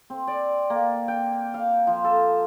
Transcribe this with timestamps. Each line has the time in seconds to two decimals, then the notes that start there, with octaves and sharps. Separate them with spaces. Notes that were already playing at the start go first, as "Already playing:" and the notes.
0.10 C4
0.27 D5
0.70 A#3
1.08 G5
1.54 F5
1.87 F3
2.04 A4